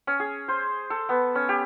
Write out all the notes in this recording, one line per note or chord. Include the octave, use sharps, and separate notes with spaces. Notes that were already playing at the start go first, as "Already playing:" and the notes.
C#4
G#4
C5
A4
B3
C#4
G4